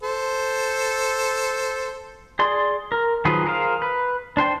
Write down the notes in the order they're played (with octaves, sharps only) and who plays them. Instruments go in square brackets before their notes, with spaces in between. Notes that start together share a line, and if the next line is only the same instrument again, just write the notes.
[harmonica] A4 C5
[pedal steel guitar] G#4 D5 C6
A#4
D#3 F3 F#3 G#4 B4
G#4 A#4 C5 F5
B4
D4 C5 G5 C6